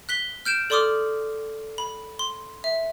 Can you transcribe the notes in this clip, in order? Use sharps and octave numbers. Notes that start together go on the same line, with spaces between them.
F#6 B6 G7
F6 G6 D7 E7
A4 D5 C6 D6 D#6 F6
B5
C6
E5